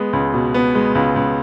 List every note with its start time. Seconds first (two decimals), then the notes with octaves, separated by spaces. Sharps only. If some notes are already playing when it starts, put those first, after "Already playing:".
Already playing: G#3 B3
0.13 C#2
0.34 B2
0.54 B3
0.75 G#3
0.95 C#2
1.16 C#2